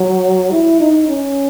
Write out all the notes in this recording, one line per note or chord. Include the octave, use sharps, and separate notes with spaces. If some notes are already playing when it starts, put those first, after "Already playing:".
Already playing: F#3
E4
D#4
C#4